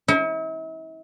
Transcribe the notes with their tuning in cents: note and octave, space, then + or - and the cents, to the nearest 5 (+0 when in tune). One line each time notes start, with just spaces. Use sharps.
E4 -45